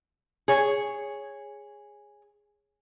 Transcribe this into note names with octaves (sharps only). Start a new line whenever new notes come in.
G#4 C#5